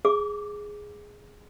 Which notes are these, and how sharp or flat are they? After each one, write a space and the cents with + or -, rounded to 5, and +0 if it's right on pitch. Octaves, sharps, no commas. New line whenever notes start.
G#4 +0 D6 +0